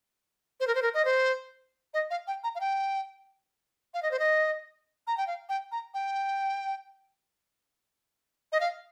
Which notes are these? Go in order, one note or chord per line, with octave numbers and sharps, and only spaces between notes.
C5
A#4
C5
A#4
D#5
C5
D#5
F5
G5
A#5
F5
G5
F5
D#5
C5
D#5
A#5
G5
F5
G5
A#5
G5
D#5
F5